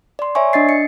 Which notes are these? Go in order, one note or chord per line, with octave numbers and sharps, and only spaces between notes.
D5 C6
C#5 D5 E5 G#5 C#6
D4 D#5 A6 C7
C#7